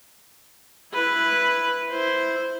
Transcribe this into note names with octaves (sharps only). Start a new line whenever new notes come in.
E4 B4
E4 C5